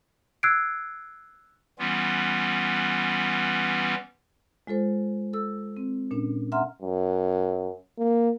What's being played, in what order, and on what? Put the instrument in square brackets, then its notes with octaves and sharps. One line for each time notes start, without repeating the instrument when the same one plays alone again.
[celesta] E6 F#6 G#6 C7 D7
[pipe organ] E3 G3 B3 C#4 F4
[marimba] G#3 F4 A4 C5
A4 E6
C4
A#2 C#4 D4
E5 F#5 A#5 C6 F6
[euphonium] F#2
A#3